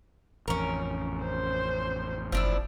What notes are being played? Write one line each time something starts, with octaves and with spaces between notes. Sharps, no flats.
A1 F2 C#4 A#4
C5
F#1 F3 D4 E4